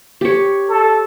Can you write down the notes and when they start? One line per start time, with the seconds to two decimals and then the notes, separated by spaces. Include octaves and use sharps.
0.21 G4 C#5
0.69 A4